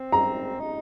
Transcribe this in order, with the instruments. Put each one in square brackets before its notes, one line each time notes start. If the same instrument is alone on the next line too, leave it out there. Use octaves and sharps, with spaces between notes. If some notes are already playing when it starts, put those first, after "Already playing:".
Already playing: [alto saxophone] C4
[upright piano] A#5
[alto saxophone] D#4